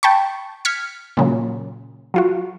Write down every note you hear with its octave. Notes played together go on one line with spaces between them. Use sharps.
G5 A5 B5 C#6
F6 G#6 B6 C#7
A#2 C#3 F#3
F#3 F4 F#4